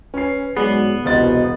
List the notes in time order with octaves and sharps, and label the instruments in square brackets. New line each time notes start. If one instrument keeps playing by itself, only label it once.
[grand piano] C#4 C7 [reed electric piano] B4 G#5
[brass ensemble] G#2 F#3 [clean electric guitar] B3 [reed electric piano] G#4 D5 [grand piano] C7
[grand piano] E1 D#5 A6 [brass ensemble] C2 B2 [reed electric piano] C5 F5 F#5